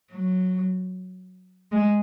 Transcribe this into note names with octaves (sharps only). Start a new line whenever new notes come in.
F#3
G#3